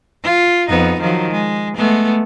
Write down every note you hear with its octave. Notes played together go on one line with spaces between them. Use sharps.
F4
F2 B3 D#4
D#3 F3 F#3
G#3
G#3 A3 B3